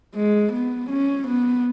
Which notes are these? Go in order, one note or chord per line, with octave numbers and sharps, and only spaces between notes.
G#3
B3
C#4
B3